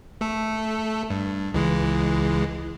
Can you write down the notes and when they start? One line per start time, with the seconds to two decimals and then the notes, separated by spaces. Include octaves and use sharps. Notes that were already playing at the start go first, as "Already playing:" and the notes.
0.21 A3 A4
1.10 G2
1.54 C#2 E3 G#3